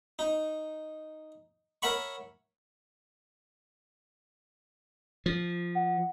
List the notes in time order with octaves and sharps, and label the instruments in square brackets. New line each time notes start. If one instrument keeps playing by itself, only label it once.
[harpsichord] D#4
A#4 C#5 E5 F#5 B5 C#6
[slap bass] F3
[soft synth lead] F#5